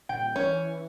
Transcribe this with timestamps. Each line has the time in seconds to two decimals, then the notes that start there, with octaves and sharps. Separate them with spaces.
0.09 D#1 G5
0.36 E3 C#4